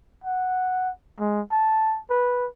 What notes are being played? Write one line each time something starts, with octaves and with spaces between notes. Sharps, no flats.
F#5
G#3
A5
B4